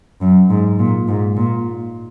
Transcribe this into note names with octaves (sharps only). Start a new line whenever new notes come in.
F#2
G#2
A#2
G#2
A#2